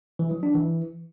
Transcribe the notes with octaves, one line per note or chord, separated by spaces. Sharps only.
E3
F#3
D4
E3